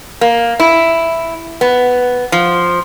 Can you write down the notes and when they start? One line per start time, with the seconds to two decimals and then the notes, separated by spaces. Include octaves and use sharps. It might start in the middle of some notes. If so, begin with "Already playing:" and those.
0.21 A#3
0.60 E4
1.61 B3
2.32 F3